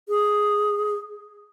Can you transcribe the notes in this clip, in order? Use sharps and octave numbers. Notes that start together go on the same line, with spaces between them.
G#4